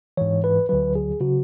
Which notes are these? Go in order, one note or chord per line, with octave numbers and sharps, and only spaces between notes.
G#2 E3 C#5
B4
D2 D3 F#3 B4
G#4
C#3 F#3 F#4